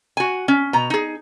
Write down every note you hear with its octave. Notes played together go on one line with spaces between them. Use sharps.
F#4 G#5
C#4
B2 A#5
D#4 G#4